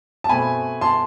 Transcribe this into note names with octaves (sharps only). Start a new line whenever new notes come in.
A5
B2 A3 C4 G#5 B5
A5 C6